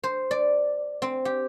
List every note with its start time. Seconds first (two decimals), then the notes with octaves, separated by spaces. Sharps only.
0.04 C5
0.31 D5
1.02 C4
1.25 G4